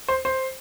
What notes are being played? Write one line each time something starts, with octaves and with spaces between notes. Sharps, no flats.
C5
C5